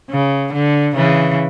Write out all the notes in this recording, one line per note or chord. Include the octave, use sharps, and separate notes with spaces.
C#3
D3
C#3 E3